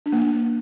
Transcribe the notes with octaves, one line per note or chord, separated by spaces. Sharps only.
D4
A#3
D4